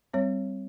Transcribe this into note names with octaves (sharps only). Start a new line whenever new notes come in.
G3 C4 C#5